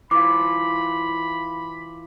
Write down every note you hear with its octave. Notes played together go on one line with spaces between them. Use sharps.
E3 F4 B5 D6